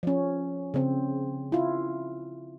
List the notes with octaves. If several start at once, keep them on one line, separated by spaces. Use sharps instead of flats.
F3 C#4
C#3 C4
E4 F4